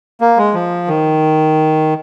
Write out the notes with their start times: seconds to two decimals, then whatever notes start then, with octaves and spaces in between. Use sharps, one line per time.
0.21 A#3
0.37 G#3
0.54 F3
0.88 D#3